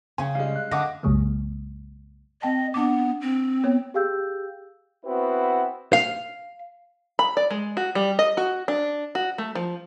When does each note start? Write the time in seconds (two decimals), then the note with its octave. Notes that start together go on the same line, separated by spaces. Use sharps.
0.18 C#3 C#4 G#5
0.35 G3 G#3 F5
0.56 F#6
0.71 D3 D#5 F#5 D6 A#6
1.03 C2 F#2 C#3 F#3 G#3 A#3
2.42 C4 D#5 G5 A5
2.74 B3 D4 D6
3.21 C4
3.64 B3 C#5
3.94 G4 G#4 F5 G5 E6 G6
5.05 B3 C4 E4 F#4 B4
5.93 F5
7.19 B5
7.37 D5
7.50 G#3
7.77 F#4
7.95 G3
8.19 D#5
8.37 F#4
8.68 D4
9.15 F#4
9.38 A3
9.55 F3